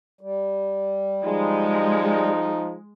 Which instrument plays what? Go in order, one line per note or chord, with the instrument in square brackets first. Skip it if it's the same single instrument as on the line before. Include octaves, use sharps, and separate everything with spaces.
[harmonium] G3
[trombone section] F3 D#4 [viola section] G#3